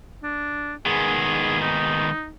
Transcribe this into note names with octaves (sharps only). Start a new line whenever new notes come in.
D4
D#3 G#3 B3 G#4
D#4